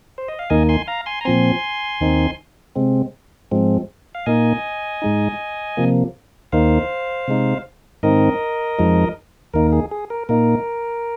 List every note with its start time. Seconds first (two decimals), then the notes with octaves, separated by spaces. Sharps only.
0.18 C5
0.28 D#5
0.39 F5
0.50 D#2 D#3 A#3 D#4 D#5 G#5
0.69 G#5 C6
0.87 F5 A#5
1.06 G#5 C6
1.21 A#5
1.25 A#2 F3 C4 G#5 C6
2.01 D#2 D#3 C4 D#4
2.75 C3 G#3 C4
3.51 G#2 F3 G#3 C4
4.15 F5
4.26 A#2 A#3 D#4 D#5 G#5
5.02 G#2 G#3 D#4
5.77 C3 F3 A#3
6.52 D#2 D#3 A#3 D#4 C5 F5
7.28 C3 G#3 D#4
8.03 G#2 D#3 C4 D#4 A#4 D#5
8.79 F2 F3 G#3 D#4
9.54 D#2 D#3 A#3 D#4 A#4
9.73 G#4
9.91 G#4
10.10 A#4
10.29 A#2 A#3 D#4 A#4